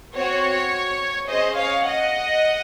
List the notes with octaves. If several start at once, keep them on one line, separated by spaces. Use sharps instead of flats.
C4 F#4 C#5
C#4 G#4 C5 D#5
C#5 F5
D#5 F#5